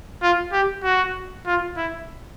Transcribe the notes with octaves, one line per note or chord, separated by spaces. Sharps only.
F4
G4
F#4
F4
E4